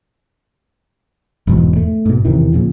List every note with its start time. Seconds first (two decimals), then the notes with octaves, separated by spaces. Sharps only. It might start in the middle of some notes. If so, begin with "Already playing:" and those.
1.47 E1 E2 G#2 B2
1.76 A3
2.06 G#2 B2
2.25 E2 C3 D#3 E3
2.53 A#2 C#3 F3